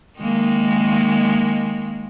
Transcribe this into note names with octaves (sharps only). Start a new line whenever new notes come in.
D#3 G#3 A#3